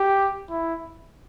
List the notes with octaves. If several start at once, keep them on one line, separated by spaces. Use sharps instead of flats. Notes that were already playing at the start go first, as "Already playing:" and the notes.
Already playing: G4
E4